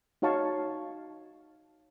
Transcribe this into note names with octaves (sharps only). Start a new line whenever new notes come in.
D#4 F#4 C#5 F5 A5 C#6